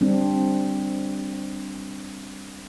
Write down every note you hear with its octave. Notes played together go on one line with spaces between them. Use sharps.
G3 C4 D4